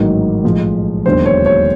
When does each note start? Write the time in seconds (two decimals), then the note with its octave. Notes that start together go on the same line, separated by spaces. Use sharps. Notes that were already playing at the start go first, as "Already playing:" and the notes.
Already playing: A1 G#2 D#3 F#3 A#3
0.44 B1 A2 F3 G#3
1.05 E1 D#2 D3 F#3 C5
1.26 C#5
1.46 C#5